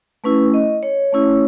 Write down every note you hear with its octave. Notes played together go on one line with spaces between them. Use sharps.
A3 C#4 E4 B4
D#5
C#5
A3 C#4 E4